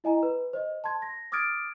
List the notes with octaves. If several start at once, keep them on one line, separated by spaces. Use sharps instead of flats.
E4 D#5 G#5 A#5
B4
C5 D#5
A5 C6 G#6
A#6
D6 D#6 F6 G#6 A6 D7